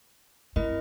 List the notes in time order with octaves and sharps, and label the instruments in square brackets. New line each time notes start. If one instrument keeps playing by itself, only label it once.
[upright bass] C4 [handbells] E4 A#4 D#5